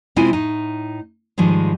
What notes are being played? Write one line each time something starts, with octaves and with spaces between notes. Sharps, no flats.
C3 G#3 C4 E4 F4 G#5
A2 D#4
G#2 D#3 F3 G3 G#3